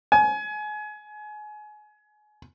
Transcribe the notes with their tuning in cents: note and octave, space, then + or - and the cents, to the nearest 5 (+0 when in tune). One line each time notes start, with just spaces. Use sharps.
G#5 +30